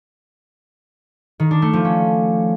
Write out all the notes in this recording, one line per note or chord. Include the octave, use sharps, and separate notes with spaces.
D#3
D4
A3
F3
C#4